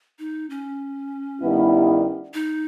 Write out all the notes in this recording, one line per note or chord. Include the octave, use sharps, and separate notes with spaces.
D#4
C#4
G2 D#3 G3 B3 E4
D#4